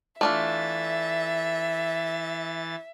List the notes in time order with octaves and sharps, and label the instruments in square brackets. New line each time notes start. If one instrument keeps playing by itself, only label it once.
[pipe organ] E3 A6 [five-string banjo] A3 D4 F4 [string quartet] E5